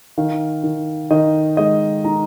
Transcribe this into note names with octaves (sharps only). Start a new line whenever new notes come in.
D#3 F5
D#3
D#3 D#5
G#3 D#5
D#4 A#5